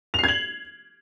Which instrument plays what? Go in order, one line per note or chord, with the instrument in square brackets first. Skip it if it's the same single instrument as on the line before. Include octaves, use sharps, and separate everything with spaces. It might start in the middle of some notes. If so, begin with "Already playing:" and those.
[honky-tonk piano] F7
C7
G#6
F#7